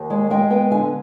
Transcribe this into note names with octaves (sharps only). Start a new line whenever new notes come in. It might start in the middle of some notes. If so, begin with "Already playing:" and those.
Already playing: D#2
G#3
G#3 G5
B3 G5
D3 G#5